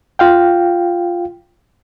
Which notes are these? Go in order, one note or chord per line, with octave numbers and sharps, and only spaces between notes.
F4 F5 G5